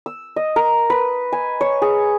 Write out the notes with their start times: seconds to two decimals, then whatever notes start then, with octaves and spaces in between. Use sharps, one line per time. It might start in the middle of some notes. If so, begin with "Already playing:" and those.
0.06 E6
0.36 D#5
0.56 A#4
0.90 B4
1.33 G#5
1.61 C#5
1.82 G#4